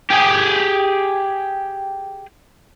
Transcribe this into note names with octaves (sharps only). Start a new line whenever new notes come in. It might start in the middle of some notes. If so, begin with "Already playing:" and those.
G4 G#4